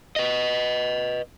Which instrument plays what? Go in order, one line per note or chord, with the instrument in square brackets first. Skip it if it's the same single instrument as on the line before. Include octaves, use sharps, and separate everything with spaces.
[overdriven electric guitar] B4 D#5